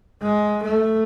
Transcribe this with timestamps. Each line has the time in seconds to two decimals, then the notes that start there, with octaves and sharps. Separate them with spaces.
0.22 G#3
0.63 A3